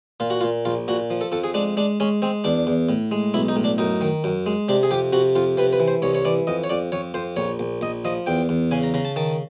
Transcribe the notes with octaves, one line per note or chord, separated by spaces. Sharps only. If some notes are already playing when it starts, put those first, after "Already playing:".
A#2 F4
F#4
F4
A#2
A#1 F4
A#2 F#4
F3
A4
F2 A4
G#4
G#3 D4
G#3 D4
G#3 C#4
G#3 C4
E2 D4
E2
A2
G#3
B1 E4
D#4
A2
D4
F#2 D#4
D#3
F#2
G#3
C3 D4
G#4
F2 G4
C3 F#4
F2 F4
C3 B4
B4
E3
C5
C2 C#5
C#5
E3 D5
F2 D#5
C#5
F2 D5
F2 C#5
F2 C5
A#1 C#5
A#1
A#1 D#5
F3 D#5
E2 G5
E2
C#3 G#5
A#5
C#3 A#5
A5
D#3 A5